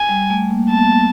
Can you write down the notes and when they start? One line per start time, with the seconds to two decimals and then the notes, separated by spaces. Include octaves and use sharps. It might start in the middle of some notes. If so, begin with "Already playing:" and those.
Already playing: G#5
0.09 G3
0.30 A3
0.51 A#3
0.71 B3 A5